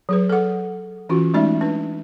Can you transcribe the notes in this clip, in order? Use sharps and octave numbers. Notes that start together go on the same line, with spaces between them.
F#3 G#4 B4
A4 F#5
E3 C#4 F4 F#4
G#3 A3 C#4 D#4 D5 E5
D4 B4